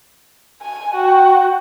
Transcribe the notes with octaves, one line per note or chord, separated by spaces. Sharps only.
G#5
F#4 G5